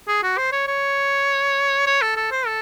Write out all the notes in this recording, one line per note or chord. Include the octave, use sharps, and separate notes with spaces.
G#4
F#4
C5
C#5
C#5
C#5
A4
A4
C5
A4